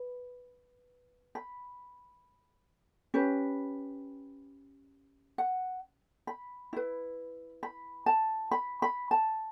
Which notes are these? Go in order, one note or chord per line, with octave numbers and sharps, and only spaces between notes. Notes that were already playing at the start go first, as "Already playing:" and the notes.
Already playing: B4
B5
C#4 G4 B4
F#5
B5
E4 B4
B5
A5
B5
B5
A5